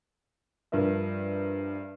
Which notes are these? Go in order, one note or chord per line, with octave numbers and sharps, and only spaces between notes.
G2 F3 A#4 E5